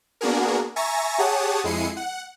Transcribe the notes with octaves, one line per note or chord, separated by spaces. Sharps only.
A#3 B3 D4 F#4 G#4 A#4
E5 G#5 A#5 C#6 A6 A#6
G4 G#4 C#5 F#5 A5 D#6
F2 G#3 E4 C7 C#7 D#7
F#5